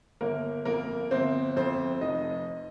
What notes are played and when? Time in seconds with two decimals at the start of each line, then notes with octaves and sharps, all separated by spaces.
0.21 G1 A#3 A#4
0.65 F2 A#3 A#4
1.11 G1 C4 C5
1.56 F2 C4 C5
2.01 F1 D#4 D#5